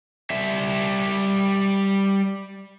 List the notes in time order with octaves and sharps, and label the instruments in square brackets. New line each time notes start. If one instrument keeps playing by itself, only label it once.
[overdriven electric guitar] G3 E5